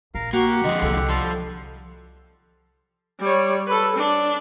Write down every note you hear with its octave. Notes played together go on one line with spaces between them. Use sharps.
A#1 A#4 F5
A#3 F#4 G4 F#5
D3 F3 G#3 D#5
C2 D#4 A4
F3 G3 A5 C6
G3 C#5
A4 B4
D4